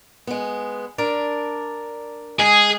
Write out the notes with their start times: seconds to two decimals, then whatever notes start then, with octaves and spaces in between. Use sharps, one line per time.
0.27 G#3 B3
0.98 D4 A#4 D5
2.39 G#3 G#4